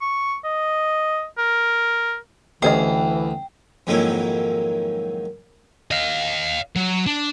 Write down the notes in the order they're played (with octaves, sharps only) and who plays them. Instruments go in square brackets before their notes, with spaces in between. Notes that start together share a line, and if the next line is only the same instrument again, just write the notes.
[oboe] C#6
D#5
A#4
[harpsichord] D2 [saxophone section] E3 [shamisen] G3 C#4 D#5 [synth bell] G5
[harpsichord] F2 G#2 D#3 F#3 A#3 E4
[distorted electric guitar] D#5 F5
F#3
D4